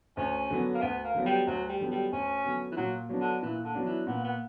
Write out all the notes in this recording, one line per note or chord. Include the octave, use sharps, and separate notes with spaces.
D2 C#4
D3 F#3 B3
A#3
D2 B3
A#3
D3 F#3 B3
G3
D2 F#3
G3
D3 F#3 B3
G3
D2 C#4
D3 F#3 B3
E3
A#2 F#3
F#3 B3 D4
D3
A#2 E3
D3
F#3 B3 D4
E3
A#2 B3
B3